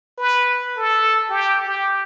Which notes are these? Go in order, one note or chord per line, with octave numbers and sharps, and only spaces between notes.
B4
A4
G4
G4